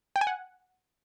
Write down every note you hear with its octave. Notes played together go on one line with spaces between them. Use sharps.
G5
G#5
F#5